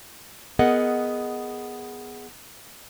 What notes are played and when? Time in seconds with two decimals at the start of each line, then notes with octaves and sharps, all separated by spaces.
0.59 B3 G#4 A#4 D#5 F#5